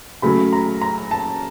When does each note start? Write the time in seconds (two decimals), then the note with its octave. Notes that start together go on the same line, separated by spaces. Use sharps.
0.22 C#3 F#3 A3 B5
0.53 A#5
0.81 A#5
1.11 A5